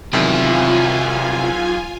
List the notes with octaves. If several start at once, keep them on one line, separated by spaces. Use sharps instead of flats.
E2 C3 D#3 F#3 E4 F4 G#5